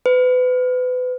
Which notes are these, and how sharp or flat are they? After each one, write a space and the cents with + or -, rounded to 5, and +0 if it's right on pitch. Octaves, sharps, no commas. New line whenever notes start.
B4 +30